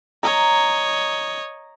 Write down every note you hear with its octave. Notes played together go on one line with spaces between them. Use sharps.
C#5 D#5 A#5